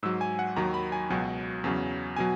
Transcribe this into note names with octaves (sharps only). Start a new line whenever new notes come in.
G#2 F#3 E6
G#5
F#5
D#2 D#3 F#3 A#5
B5
G#5
C#2 B2 F#3
E2 C#3 F#3
B2 F#3 G#5